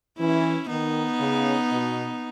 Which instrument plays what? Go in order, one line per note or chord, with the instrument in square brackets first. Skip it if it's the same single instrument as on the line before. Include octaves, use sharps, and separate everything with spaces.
[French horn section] E3 [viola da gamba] C#4 E4
[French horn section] D#3 [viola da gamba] B3 D#4
[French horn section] C#3
B2